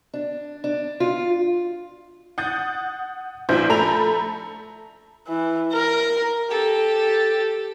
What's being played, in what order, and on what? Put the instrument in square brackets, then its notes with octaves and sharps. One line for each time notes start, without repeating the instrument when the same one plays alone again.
[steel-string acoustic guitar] D4
D4
F4
[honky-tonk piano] F#5 D#6 G6 A6
A#1 F3 E4 C5 G6
A3 A4 A#5 B5 F7
[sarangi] E3
A#4
[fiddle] G4 A4